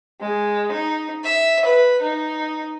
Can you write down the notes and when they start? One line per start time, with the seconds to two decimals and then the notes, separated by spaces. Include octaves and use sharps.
0.21 G#3
0.72 D#4
1.24 E5
1.65 B4
2.01 D#4